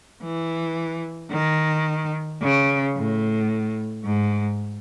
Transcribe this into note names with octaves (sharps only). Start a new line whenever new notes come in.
E3
D#3
C#3
A2
G#2